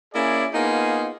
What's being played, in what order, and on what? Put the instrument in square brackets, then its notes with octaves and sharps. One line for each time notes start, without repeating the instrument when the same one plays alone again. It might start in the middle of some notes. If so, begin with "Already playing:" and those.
[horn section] A#3 C#4 E4 G#4 D5
A#3 B3 D#4 F4 G#4